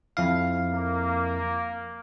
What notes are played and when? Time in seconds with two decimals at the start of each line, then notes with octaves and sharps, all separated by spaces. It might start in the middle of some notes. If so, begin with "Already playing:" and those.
0.17 F2 E4 F5
0.72 A#3